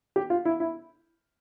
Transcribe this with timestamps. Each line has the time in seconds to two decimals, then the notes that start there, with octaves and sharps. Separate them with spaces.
0.16 G4
0.30 F4
0.45 E4
0.60 E4